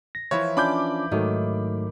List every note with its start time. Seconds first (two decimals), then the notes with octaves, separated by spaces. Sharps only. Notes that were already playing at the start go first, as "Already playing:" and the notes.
0.15 A#6
0.31 E3 F3 E4 C#5
0.57 C#4 D4 F4 B5 D6 G6
1.11 G#2 D#3 F#3 A3